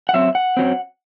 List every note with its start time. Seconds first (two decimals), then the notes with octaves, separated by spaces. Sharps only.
0.09 F#5
0.13 F#2 F#3 C4 E5
0.35 F#5
0.57 F#2 F#3 C4